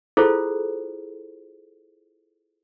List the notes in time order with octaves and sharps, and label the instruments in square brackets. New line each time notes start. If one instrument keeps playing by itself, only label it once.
[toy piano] E4 F4 G#4 A4 C5